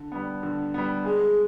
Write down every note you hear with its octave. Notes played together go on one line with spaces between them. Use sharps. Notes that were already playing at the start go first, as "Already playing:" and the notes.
Already playing: D3
G3 B3
D3
G3 B3
G#3 G#4